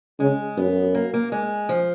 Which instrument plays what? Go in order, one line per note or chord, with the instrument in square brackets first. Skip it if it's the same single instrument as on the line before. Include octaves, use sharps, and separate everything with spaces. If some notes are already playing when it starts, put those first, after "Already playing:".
[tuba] C#3 [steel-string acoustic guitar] G#3
[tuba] F#2 [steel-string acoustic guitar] B3
[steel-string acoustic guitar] A#3
A#3
G#3
F3